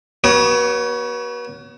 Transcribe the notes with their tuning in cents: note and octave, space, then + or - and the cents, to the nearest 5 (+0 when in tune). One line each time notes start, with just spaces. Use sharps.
B3 -35 F#4 +40 C#5 +15